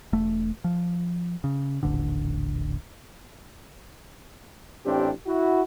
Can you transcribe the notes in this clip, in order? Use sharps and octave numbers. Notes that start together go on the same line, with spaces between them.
E1 A3
F3
C#3
D#1 A1 D3
A1 C4 D4 G4
E4 F#4